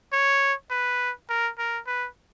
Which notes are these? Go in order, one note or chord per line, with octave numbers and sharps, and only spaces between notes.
C#5
B4
A#4
A#4
B4